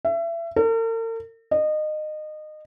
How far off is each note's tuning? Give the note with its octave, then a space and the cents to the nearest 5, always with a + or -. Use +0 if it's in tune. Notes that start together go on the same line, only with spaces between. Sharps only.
E5 +30
A#4 -45
D#5 -25